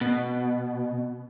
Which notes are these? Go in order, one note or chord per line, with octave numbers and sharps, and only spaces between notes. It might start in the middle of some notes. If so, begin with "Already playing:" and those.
B2